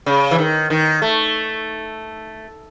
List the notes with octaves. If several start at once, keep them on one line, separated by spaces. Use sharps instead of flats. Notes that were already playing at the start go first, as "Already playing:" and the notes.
C#3
E3
D#3
D#3
A3